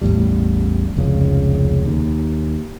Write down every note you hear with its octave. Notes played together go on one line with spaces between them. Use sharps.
A1 E2 A2 G3
F1 C#2 C#3
D#2